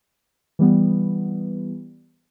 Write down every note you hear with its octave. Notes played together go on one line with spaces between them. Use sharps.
E3 G3 B3